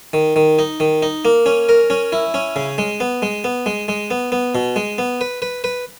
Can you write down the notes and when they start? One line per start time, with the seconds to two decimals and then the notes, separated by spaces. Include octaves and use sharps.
0.13 D#3
0.36 D#3
0.59 D#4
0.80 D#3
1.02 D#4
1.25 A#3
1.46 C#4
1.69 A#4
1.90 C#4
2.12 E4
2.34 C#4
2.56 C#3
2.78 G#3
3.00 B3
3.22 G#3
3.44 B3
3.66 G#3
3.88 G#3
4.11 B3
4.32 B3
4.55 B2
4.76 G#3
4.98 B3
5.21 B4
5.42 B4
5.64 B4